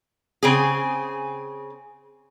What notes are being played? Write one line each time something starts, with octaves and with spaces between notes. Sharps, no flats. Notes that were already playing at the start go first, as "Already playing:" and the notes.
C#3 C4 G#4